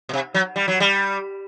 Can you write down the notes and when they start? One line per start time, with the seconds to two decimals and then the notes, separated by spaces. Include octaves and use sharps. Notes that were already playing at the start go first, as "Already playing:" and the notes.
0.09 B2
0.13 C3
0.34 F#3
0.56 G3
0.68 F#3
0.80 G3